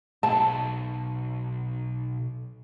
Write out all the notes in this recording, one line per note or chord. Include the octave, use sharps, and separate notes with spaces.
B1 A5